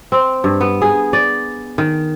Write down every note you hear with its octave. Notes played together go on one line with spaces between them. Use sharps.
C4
G2
B3
G#4
D5
D#3